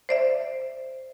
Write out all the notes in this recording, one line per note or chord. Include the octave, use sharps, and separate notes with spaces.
C5 D5 E5